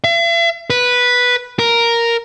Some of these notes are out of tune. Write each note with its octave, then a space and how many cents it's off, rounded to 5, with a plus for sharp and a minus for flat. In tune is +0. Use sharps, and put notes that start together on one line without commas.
E5 +45
B4 -5
A#4 +0